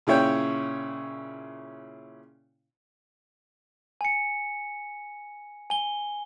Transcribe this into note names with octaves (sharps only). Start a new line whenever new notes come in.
A#2 C#3 E4 C#5 G5
G#5 C#7
G#5 G7